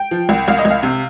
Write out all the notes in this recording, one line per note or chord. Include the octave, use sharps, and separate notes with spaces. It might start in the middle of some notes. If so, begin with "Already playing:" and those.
Already playing: G5
F3
C2
C2 F5
D#5
C2
F5
C3